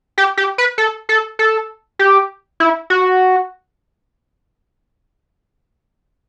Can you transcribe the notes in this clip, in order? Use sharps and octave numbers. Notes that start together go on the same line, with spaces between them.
G4
G4
B4
A4
A4
A4
G4
E4
F#4